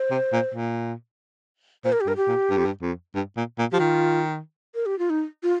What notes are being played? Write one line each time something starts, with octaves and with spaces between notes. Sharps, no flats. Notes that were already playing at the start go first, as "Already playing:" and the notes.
Already playing: C5
C3
A#2
A#2
A#2 C5
A#4
G4
G2 A#4
G4
A#2
G2
F2
G2
F2
G2
A#2
A#2
F3 G4
D#3 F4
A#4
G4
F4
D#4
F4